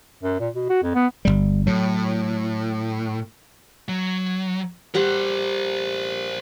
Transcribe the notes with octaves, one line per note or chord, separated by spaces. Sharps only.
F#2
A#2
B2
F#4
F2
B3
G1 C2 G3
A2 F#3
F#3
G3 G4 A#4 C5 F#5